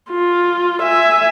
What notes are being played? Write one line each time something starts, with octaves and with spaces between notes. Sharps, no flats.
F4
E5 G#5